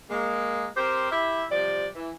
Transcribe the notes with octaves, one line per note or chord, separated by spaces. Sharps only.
G#3 A#3
C4 G4 A#4 C5
E4 G4 E5
C3 F3 G3 D5
E3